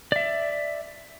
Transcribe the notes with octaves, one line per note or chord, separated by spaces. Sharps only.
D5 E5